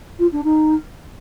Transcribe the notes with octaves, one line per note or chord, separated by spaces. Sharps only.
F4
D4
D#4